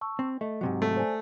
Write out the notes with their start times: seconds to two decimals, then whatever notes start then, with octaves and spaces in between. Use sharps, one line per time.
0.01 A5 C#6 E6
0.19 C4
0.41 A3 D#5
0.61 G#2 C3 F#3
0.82 A3
0.97 C5 D5 G#5